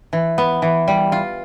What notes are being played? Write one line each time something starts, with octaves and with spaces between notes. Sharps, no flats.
E3
B3
E3
G3
F4